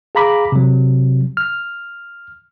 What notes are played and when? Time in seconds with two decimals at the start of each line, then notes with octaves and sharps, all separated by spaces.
0.15 G#4 F5 A#5 B5 D6
0.52 C3 F#3
1.37 F6